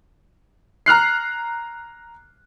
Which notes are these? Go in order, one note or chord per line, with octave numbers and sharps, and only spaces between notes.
A#5 F6 F#6 C7